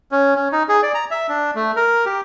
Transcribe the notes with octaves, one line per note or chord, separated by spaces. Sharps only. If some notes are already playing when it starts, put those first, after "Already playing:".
C#4
C#4
D#4
G#4
D5
A#5
E5
D4
A3
A#4
G4